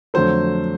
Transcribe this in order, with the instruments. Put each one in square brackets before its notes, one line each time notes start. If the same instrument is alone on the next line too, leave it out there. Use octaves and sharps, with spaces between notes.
[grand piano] F2 D3 F#3 A3 C5